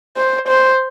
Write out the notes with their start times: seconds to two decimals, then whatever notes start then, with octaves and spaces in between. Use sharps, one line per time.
0.17 C5
0.48 C5